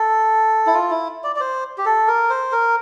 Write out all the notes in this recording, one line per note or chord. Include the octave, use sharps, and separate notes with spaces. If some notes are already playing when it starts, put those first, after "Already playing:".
Already playing: A4
E4
F4
E4
D5
D5
C5
G4
A4
A#4
C5
A#4